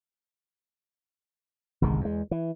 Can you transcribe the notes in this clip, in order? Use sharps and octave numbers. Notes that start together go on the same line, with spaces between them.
G1 C2 D#3 G#3
E2 G#3
E3